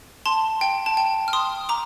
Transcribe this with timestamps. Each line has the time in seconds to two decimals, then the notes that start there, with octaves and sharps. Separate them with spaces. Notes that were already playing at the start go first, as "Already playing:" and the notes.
0.26 A5 C6
0.61 G5
0.86 A5
0.97 G5
1.28 F6
1.33 C6 D#6
1.69 A#5 D6